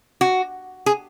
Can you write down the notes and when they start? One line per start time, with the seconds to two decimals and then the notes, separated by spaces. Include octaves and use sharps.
0.21 F#4
0.86 G#4